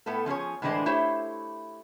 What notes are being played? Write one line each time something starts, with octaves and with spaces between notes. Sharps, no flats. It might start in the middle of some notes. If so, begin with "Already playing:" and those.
A2 A3 B3 A4
F3 C#4 G#4 C#5
A2 D3 E3 G#3 D4 C5
A3 E4 G4 C5 C#5 E5